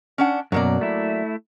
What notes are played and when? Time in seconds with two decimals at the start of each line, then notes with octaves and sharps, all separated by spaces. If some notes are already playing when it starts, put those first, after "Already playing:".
0.18 C#4 D4 F#5
0.52 F#2 B2 F#3 A#3 D5
0.81 A3 E4